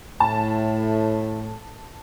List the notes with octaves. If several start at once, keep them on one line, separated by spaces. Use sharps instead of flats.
A2 A5